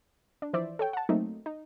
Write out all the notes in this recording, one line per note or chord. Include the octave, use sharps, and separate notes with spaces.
D4
E3 F3 E4 C5 D5 E5
A4 C#5 G5
F#5 A5
F#3 A3 A#3 C4 D#4
D#4